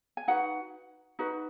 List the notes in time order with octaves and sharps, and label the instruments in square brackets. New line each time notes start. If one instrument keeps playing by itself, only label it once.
[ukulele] G#5
D#4 F#4 B4 F#5
D#4 F#4 B4